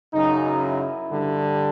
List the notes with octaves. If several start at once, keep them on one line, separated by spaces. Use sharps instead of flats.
F#2 C#3 F#3 D#4
E4
G2 D3 G3